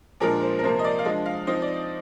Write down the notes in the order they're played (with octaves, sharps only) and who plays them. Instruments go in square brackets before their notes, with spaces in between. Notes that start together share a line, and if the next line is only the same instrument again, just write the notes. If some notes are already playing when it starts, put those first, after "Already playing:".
[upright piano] A#2 F3 G#3 D4 A#4
C5
A#4
C3 F3 A#3 C5
D#5
D5
F5
F3 G#3 D4 D#5
F5
F3 C4 D#4 D#5
D5